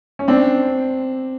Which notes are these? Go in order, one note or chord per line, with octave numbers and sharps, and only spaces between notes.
C#4
C4 D4